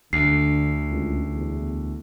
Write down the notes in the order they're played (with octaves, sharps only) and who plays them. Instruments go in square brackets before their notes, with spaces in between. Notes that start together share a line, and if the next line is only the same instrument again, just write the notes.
[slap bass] D2 [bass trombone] D3 [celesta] C7
[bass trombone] C#2
E2